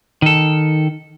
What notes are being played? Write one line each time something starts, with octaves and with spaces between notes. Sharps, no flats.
D#3 A4